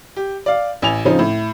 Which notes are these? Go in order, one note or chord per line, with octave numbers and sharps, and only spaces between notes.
G4
D5 F5
A1 G#5 F7
C#3 F3 C4 D#4
A2